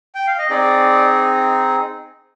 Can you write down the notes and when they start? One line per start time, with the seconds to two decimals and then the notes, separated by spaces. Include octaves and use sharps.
0.15 G5
0.27 F5
0.39 D#5
0.50 C4 D#4 G#4 D5